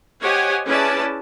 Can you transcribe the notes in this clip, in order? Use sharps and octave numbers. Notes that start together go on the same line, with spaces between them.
G4 C5 C#5 D#5 F#5 G#5
C#4 E4 G#4 B4 D5 A5